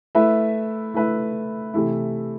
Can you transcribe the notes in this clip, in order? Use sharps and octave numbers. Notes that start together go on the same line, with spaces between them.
A3 E4 B4 E5
A3 E4 B4 E5
C3 E3 A3 E4